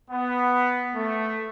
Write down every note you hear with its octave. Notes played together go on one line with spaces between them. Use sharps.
B3
A3